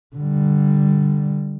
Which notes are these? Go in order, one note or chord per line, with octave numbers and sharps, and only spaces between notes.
D3 G3